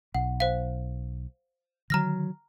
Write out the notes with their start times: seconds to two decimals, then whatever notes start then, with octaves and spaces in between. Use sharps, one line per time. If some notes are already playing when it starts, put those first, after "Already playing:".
0.15 B1 F#5
0.40 C5 F5
1.90 D3 D#3 F#3 A#5 F6 A#6